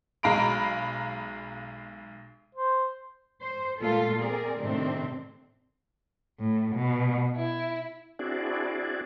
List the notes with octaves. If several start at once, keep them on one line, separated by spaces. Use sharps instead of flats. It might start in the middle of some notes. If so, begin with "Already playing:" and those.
B1 G#3 F5 A#5 B5 D7
C5
C5
A#2 G#3 A3 F4 A4
C4 G#4 A#4 D5
A2 C3 D#3 C4 D4
A2
B2
E4
C4 D4 E4 F#4 G#4 D5